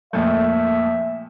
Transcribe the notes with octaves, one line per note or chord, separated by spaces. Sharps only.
F2 A#2 A3 E5